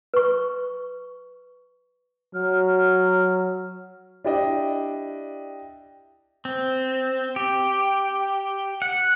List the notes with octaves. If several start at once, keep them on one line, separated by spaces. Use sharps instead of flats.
B4 C#6
F#3 F6
D4 E4 G4 D5 D#5
C4
G4
F#5